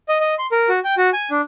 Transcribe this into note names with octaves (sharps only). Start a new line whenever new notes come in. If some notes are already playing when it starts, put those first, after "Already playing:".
D#5
D#5
C6
A#4
F#4
G5
F#4
G#5
D4